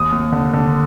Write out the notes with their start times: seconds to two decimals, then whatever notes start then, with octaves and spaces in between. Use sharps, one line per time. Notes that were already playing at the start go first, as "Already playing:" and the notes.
Already playing: D#2 D#6
0.12 D#2
0.32 D3
0.53 D3